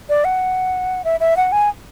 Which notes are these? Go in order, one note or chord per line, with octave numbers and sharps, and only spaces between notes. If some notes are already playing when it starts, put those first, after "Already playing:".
D5
F#5
E5
E5
F#5
G#5